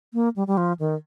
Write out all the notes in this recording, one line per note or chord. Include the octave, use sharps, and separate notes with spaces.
A#3
G3
G3
F3
D#3